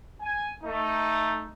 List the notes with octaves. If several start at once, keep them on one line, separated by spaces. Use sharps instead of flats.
G#5
A3 D#4